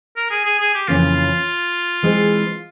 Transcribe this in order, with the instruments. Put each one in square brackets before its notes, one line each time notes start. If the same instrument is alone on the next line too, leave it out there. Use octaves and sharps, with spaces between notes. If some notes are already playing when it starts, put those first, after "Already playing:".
[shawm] A#4
G#4
G#4
G#4
G4
[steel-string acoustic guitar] F2 C#3 E3 A#3 C#4 [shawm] F4
[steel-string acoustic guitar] E3 G#3 C4